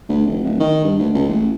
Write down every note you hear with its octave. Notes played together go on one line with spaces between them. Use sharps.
D2
F1
D1
D#3
G2
D2
C#2
A1